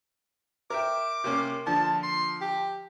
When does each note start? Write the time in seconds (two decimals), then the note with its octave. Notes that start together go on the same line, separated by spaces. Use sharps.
0.70 A#4 E5 G5 D6
1.24 C3 A#3 C#4
1.66 A#2 D3 F3 A5
2.03 C6
2.41 G4